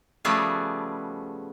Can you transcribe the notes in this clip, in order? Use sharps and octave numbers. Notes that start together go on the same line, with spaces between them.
C#3 F3 G3 A3 B3 G#4